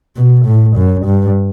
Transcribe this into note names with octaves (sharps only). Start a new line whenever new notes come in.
B2
A2
F#2
G2